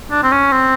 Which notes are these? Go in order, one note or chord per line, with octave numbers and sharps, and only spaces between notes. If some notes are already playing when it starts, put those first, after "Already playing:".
D4
C4
C#4
C4